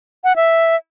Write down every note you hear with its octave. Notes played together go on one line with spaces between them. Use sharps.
F#5
E5